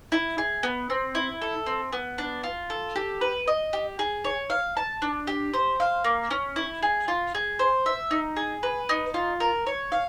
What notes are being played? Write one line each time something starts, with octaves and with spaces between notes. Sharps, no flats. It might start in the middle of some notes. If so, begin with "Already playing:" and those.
E4
G#4
B3
C4
E4
A4
C4
B3
D4
F4
A4
G4
B4
D#5
G4
G#4
C#5
F5
A5
D4
G4
C5
F5
A#3
C#4
E4
G#4
F4
G#4
C5
E5
D#4
G#4
B4
D#4
F4
A#4
C#5
F5